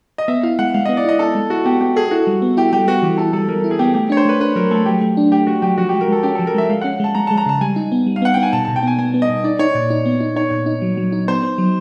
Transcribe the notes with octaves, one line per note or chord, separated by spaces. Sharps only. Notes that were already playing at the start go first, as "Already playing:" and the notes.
D#5
B3 E5
E4 F5
G#3 F#5
G#3 F5
D#5
B3
D5
E4 D#5
E4 A4
G#3
E4 F#4
B3 G4
B3 G4
G#4 A4
E4 F#4
G3
B3
E4 G4
G3 G4
B3 F#4
E3 G4
E4 A4
G3 A4
G3 A#4
E4
G#4
B3 G4
A3 G4
D4 C#5
C5
A3 B4
D4 B4
F#3 A#4
A3 A4
F#3 G4
A3
D4
A3 G4
A3 F#4
F#3 G4
F3 F#4
G4
G#3
A#4
G#3 A4
C#4 G4
A4
F3
A#4
G#3 E5
G#3 F5
C#4 F#5
G#3 A5
G#3 A#5
A5
G#3
A#5
C#3 A5
G3 G#5
D#4
B3
G3
F5
B3 F#5
B3 G5
G#5
B2 A5
B2 A5
G5
B3 G#5
B3 G#5
B3
D#5
B2
D#4 D5
D#4 C#5
A#2 D5
D#4
B3
D#4
D#4 C#5
A#2
D#4
F#3
F#3
D#4
B3 C5
B3
F#3